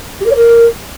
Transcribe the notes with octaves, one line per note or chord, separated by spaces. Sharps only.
G4
A#4
C#5
A#4